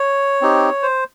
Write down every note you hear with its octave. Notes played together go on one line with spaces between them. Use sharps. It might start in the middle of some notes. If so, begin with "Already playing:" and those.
Already playing: C#5
C4 D#4 G4
C5